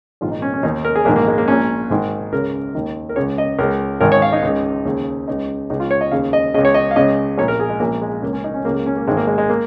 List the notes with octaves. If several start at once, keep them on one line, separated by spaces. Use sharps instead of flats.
A#1 G#2 D#3 F4
D#4
C#4
C#4
D#2 D#3 D#4
A#4
G#4
A#1 G#2 D#3 A#3
A#3
G#3
A#3
A#1 A#2 C#4
G#1 G#2 D#3
C#2 C#3 A#4
D#2 D#3
A#4
C#2 C#3 C#5
D#5
C#2 C#3 A#4
G#1 G#2 D#3 A#4
C#5
F5
D#4
C#2 C#3
D#2 C#3
C#2 C#3 D#4
C#2 C#3 D#4
F4
C#5
D#5
D#2 C#3 F5
D#5
C#2 C#3 D#5
C#5
D#5
F5
C#2 C#3 D#5
A#1 A#2 C#5
A#4
G#4
G#3
A#1 A#2 A#3
G#3
C#2 C#3 A#3
C#4
D#4
C#4
C#2 C#3 A#3
A#3
C#4
A#3
G#1 G#2 D#3 G#3
A#3
G#3
G#3
A#3